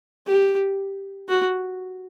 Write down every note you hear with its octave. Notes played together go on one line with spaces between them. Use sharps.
G4
F#4